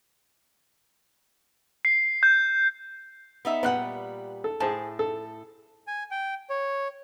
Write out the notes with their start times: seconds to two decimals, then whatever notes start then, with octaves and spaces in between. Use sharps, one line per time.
1.85 C7
2.23 G6
3.45 B3 D#4 E5
3.63 A#2 G3 B3 F#5 F#6
4.44 A4
4.60 A2 G#4 C5 A5
4.99 A4
5.87 G#5
6.11 G5
6.50 C#5